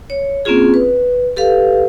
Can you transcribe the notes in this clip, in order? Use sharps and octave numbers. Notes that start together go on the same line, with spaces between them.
C#5
A#3 C4 C#4 F4 G#4
B4
G4 A4 B4 F5